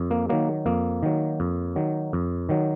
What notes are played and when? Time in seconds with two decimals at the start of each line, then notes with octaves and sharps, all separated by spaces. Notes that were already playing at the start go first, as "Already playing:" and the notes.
Already playing: F2
0.11 A#3
0.29 D#3 F#3 A#3
0.66 F2 A#3
1.03 D#3 F#3
1.40 F2
1.76 D#3 F#3
2.13 F2
2.49 D#3 F#3